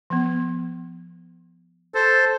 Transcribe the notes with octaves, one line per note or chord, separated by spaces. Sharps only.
F3 B3
A4 C5